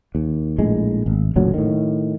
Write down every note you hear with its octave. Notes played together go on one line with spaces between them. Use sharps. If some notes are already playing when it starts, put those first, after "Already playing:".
D#2
A#1 A2 G#3
G#1
F#1 D2 A#2 F#3
A2 D#3